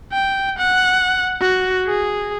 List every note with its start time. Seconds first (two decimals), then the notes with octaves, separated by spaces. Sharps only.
0.12 G5
0.58 F#5
1.41 F#4
1.87 G#4